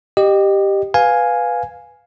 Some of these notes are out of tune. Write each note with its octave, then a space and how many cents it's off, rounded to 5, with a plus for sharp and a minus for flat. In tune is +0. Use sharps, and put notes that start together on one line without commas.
G4 +0 D#5 -25
B4 +0 F5 +10 G#5 +0